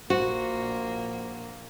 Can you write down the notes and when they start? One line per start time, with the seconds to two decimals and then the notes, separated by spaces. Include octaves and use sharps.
0.10 A#1 A#3 F#4 C5